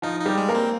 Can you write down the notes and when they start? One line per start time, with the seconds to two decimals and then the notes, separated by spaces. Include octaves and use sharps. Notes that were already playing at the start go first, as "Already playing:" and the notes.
0.02 F3 D#4 F4
0.20 D#4
0.26 G3 G4
0.37 G#3
0.49 A#3 A#4
0.55 C4